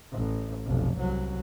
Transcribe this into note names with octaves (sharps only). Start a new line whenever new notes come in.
A1
F1 B1
C2 F#3